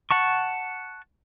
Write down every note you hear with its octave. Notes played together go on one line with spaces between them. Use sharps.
F#5 A5 C#6